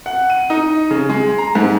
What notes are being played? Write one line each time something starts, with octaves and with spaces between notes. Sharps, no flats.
F#5
D#7
D#4
C#3
G#3
A#5
G#2